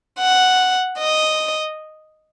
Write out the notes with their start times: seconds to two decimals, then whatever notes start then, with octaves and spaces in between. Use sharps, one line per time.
0.19 F#5
0.98 D#5